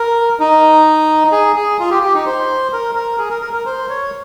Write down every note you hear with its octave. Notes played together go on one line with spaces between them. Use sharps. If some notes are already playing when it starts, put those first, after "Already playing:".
Already playing: A#4
D#4
G#4
G#4
F4
G4
G4
D#4
C5
A#4
A#4
G#4
A#4
A#4
A#4
C5
C#5